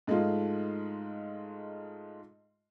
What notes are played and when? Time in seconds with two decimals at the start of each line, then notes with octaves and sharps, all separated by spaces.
0.07 G#2 G#3 A3 F4